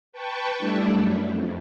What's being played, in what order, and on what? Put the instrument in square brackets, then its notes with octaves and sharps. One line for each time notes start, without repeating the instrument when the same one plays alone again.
[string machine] B4 G5 A5 C#6
G3 A3 D4 E4
F#2
F2